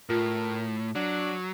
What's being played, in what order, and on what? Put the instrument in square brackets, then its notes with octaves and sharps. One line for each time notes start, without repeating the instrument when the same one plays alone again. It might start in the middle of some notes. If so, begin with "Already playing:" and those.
[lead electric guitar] A2 [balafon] F4 [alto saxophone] A#4
[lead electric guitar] F#3 [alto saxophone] D4